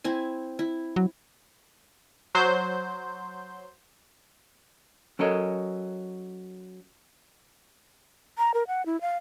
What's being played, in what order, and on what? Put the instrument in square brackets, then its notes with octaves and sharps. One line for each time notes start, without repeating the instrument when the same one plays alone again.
[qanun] C4 E4 G#5
E4
[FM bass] F#3
[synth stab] F#3 C5 G6
[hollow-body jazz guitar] F#3 C#4 A4 A#4 C#5 D#5
[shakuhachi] A#5
A#4
F#5
E4
F5